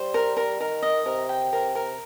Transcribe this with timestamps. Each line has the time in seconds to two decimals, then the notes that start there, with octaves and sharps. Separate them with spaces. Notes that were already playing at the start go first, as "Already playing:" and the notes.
Already playing: G3 C5
0.14 A#4
0.37 A#4
0.60 D#3 A#4
0.83 D#5
1.06 C3 A#4
1.29 G5
1.52 C3 A#4
1.75 A#4